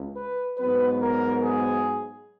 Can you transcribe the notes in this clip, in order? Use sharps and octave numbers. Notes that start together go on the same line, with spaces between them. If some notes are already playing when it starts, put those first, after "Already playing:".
Already playing: C#2
B4
G#2 F#3 B3 B4
A#4
G#4